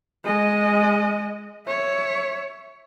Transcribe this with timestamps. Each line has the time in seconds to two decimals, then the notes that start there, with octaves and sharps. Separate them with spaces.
0.24 G#3 D#5
1.67 C#5 E5